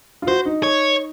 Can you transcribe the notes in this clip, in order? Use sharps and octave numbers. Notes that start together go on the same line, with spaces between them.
F4
F#4 C5
D#4
C#5